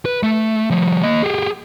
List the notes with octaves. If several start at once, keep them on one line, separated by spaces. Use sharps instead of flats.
B4
A3
F3 G3
A#3 D#5
G4 G#4